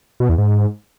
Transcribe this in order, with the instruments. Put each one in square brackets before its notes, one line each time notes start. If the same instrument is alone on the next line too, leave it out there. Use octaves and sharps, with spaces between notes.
[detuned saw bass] B2
E2
G#2